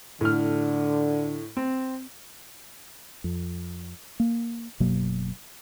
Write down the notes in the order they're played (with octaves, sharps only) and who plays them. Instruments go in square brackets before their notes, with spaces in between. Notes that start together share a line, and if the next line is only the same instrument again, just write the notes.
[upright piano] A2 F6 [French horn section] D3
[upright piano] C4
[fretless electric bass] F2
A#3
F#1 B2 F#3 A#3